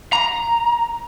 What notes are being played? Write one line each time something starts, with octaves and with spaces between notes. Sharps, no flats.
A#5